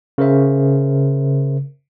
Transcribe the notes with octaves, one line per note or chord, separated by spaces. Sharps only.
C#3 A#4 C5 E5